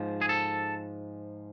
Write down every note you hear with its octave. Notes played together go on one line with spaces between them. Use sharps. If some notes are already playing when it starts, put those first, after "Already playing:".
Already playing: G#2 F3
G#4
A4